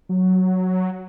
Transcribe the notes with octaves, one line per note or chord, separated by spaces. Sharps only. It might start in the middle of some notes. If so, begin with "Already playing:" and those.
F#3